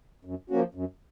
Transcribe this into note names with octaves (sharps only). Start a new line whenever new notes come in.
F#2
F3 A#3 C#4 F#4
F#2